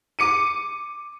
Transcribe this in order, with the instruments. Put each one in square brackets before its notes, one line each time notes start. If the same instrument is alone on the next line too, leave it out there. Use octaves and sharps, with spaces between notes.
[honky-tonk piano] D6 C#7 D#7